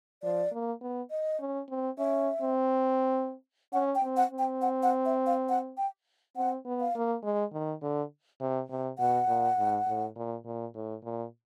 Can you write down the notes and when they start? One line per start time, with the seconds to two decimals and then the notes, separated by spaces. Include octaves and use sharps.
0.23 F3 D5
0.52 A#3
0.81 B3
1.11 D#5
1.40 C#4
1.69 C4
1.98 C#4 E5
2.42 C4
3.73 C#4 F#5
3.95 G5
4.03 C4
4.17 F#5
4.32 C4
4.38 G5
4.62 F#5
4.83 F#5
5.05 E5
5.26 F5
5.49 F#5
5.77 G5
6.36 C4 F#5
6.66 B3
6.80 F5
6.95 A#3
7.23 G#3
7.53 D#3
7.82 D3
8.41 C3
8.70 C3
8.98 B2 F#5
9.28 A#2
9.58 G#2
9.87 A2
10.16 A#2
10.45 A#2
10.74 A2
11.04 A#2